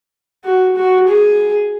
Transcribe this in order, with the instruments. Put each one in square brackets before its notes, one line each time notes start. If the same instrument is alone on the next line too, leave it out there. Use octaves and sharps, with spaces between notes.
[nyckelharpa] F#4
F#4
G#4